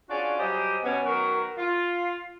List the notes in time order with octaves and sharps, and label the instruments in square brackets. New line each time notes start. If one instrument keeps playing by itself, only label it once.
[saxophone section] C#4 D4 F4 F#4 G#4 D5
F#3 G3 G4 G#4 C5 D#5
B2 B3 C#4
D#3 F#3 B3 F#4 A#4
F4